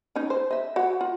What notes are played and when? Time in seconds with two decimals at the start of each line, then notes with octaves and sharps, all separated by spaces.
0.16 C#4 D#4
0.30 C5
0.51 D#5 E5
0.76 F#4 F#5
1.01 F4